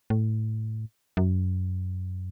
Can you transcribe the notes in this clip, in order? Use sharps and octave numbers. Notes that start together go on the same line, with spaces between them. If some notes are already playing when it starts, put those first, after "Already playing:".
A2
F#2